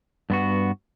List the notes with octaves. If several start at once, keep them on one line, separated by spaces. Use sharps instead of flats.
G2 B3 F#4